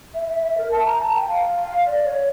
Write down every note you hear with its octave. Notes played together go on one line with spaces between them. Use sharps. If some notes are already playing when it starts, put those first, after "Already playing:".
E5
E5
E5
A#4
A5
A#5
A5
G5
F5
D5
C#5